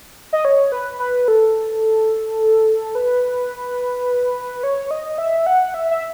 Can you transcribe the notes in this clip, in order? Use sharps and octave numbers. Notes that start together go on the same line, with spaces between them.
D#5
C#5
B4
B4
A4
B4
C#5
D#5
E5
F#5
E5
E5